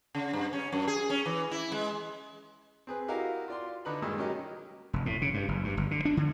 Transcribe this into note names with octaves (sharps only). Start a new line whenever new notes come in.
C#3
G2
C#4
F#2
G#4
C#4
E3
E4
G#3
C4 G#4 B4
E4 F#4 G4 A#4 D#5 F5
F4 D5 C6
D3 D#4 B4 B5
G2 A#2 D#3 G#3 D#5 E6
F#3 C#4 D#4 G4 A#4 D#5
F1
A2
C#3
G2
F#1
G2
G1
D3
D4
D3